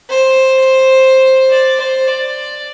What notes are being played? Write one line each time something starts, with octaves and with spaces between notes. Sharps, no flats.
C5
D5
C5
D5